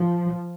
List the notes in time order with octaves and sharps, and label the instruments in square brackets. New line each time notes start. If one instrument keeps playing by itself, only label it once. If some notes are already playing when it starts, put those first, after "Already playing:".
Already playing: [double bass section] F3